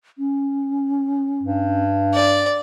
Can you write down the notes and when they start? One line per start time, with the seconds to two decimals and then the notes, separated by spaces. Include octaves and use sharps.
0.18 C#4
1.43 G2
2.14 D5